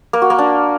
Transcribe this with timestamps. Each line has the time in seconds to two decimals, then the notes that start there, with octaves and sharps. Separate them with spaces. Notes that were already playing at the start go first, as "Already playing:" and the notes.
0.13 A#3
0.22 F#4
0.30 A#3
0.39 D4